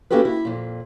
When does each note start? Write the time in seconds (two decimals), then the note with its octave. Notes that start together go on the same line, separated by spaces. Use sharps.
0.10 A#3 C#4 F#4 G4 A4 B4
0.25 E4
0.45 F2 A#2